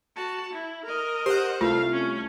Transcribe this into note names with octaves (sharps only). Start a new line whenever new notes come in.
F#4 A5
E4
A#4 D#5
G4 C5 F#5
C2 A3 F4 F5
C#4